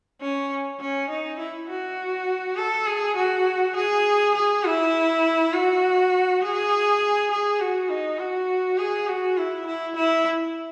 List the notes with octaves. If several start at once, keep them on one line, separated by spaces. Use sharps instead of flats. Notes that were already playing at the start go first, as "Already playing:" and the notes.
C#4
C#4
D#4
E4
F#4
A4
G#4
F#4
G#4
G#4
E4
F#4
G#4
G#4
F#4
D#4
F#4
G#4
F#4
E4
E4
E4